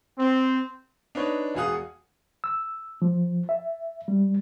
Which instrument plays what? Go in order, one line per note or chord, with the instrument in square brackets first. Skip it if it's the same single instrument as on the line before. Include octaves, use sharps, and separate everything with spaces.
[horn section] C4
[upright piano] D4 D#4 B4 C#5
E1 F#4 G#4 F5 F#5 D#6
[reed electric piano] E6
F3
E5
G3